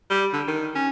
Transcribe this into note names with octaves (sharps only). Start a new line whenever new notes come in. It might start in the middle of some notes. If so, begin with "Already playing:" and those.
G3
D3
D#3
C#4